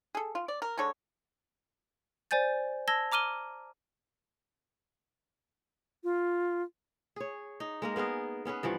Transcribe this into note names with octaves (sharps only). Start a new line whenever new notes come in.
G#4 A4
F4
D5
A#4
D3 G#3 A4 C#5
C5 D5 G#5 G6 A6
A5 E6 G#6 A#6 G7
A#5 D6 F6 D#7 G7
F4
G#4 C#5
D#4
G#3 A#3 A#4
A#3 B3 G#4 A#4
B3 C#4 G#4 B4
G2 E3 F3 F#5